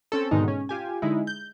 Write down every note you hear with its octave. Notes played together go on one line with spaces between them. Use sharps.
C4 C#4 A4
G#2 B2 D3 D#3 G#3 D#4
C#4
F4 G4 G#5
D3 G#3 D#4 E4
G6